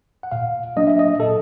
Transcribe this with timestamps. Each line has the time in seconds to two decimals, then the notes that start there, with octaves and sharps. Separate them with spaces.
0.23 F#5
0.32 A#2 F5
0.76 F#3 A#3 D4 D#5
0.87 E5
0.99 D#5
1.20 A#2 A4